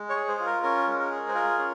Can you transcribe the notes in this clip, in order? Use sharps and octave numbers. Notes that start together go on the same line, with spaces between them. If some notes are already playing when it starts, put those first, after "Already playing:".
Already playing: G#3
C#5
G#4
C5
F4 G#4
A#4
C#4 A#4
G#3
A#4
G#4
C5
F4 A#4
C#4